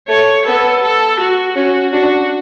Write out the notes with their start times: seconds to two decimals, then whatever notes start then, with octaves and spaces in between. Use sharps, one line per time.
0.08 A3 C#5
0.46 B3 A4
0.83 A4
1.19 F#4
1.55 C#4 F#4
1.93 D4 F#4